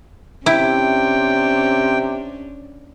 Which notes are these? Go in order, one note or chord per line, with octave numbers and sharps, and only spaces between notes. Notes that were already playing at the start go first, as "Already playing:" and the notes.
C3 C#4 D4 E4 G5